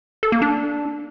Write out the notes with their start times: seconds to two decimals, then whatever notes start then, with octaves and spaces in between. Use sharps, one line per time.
0.23 A4
0.32 A#3
0.42 D4